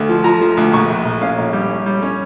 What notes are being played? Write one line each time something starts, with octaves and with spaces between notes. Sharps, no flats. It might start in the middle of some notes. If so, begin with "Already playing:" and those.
Already playing: D2 D3
F3
F3 A#5
F3
D2
A#1 C#6
A#1
A#1
C#4 F5
A#1
G3
C#4
G3
C#4